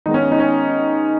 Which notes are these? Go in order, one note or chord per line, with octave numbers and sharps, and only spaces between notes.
D#3 G#3 B3 D#4
C#4
D#4
C#4